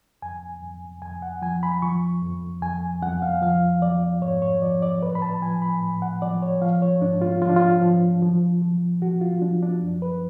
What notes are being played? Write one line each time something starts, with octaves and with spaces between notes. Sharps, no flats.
F2 G#5
F2
F2 G#5
F#5
F3 G#5
B5
F3 C#6
F2
F2 G#5
F2 F#5
F5
F3 F5
F3 D5
G#2 C#5
C#5
F3 D5
D5
A2 B4
B5
A5
F3 G#5
B5
A2
F#5
F3 D5
C#5
F3 F5
C#5
G#2 D4
F4
F3 F4
D4
F4
F3
F3
F3
F3 F#4
F4
F3 D4
D4
F#2
B4